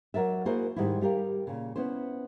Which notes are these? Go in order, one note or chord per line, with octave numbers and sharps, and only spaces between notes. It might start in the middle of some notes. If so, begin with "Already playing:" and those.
F#3 A#4 D5 E5
A#3 E4 F#4 G#4 A#4 C5
G#2 D#3 G3 G#3 E4
G3 G4 A#4 F5
A#2 C#3
B3 C#4 E4 C5